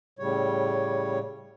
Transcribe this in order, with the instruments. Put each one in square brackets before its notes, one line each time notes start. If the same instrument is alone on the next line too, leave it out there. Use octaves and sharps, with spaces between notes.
[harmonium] A2 C#3 G3 C#5